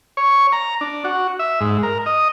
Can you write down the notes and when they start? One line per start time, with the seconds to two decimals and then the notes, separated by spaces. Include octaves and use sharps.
0.17 C#5
0.52 A#5
0.81 D4
1.05 F#4
1.39 E5
1.61 G#2
1.83 A#4
2.06 D#5